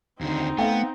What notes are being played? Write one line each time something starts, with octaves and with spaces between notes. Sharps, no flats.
D#2 D3 C4 D#4
A3 B3 F5 G5